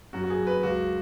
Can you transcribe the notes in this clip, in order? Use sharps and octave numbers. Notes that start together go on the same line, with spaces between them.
F#2 F#4
F#4
G#4
F#2
B4
C#2 F#4